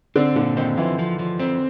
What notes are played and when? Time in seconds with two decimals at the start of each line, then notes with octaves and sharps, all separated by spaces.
0.16 D3 C4 D4
0.36 A#2 D3 D4
0.57 D#3 C4 D#4
0.77 E3 F3 E4
0.99 F3
1.19 F3
1.40 C4